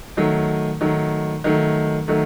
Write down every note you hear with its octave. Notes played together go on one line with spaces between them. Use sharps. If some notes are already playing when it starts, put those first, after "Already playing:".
D#3 F#3 A3
D#3 F#3 A3
D#3 F#3 A3
D#3 F#3 A3